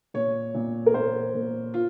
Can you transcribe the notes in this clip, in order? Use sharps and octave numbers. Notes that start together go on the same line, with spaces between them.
A#2 C#5
A#2
A#4
A#2 C5
A#2
F4